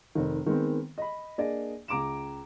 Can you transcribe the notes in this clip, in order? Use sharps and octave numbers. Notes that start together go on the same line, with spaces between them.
F1 D#3
D#3 G#3 B3 C4
D#5 B5
A#3 D4 G#4 D5 D#5
C#2 A#5 D6 D7 E7